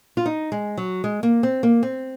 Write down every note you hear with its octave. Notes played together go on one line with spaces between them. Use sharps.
F4
D#4
G#3
F#3
G#3
A#3
C4
A#3
C4